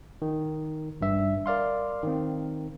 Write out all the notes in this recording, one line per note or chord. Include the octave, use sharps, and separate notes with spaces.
D#3
G#1 G2 E5
A#4 D5 F5 C6
D#3 C4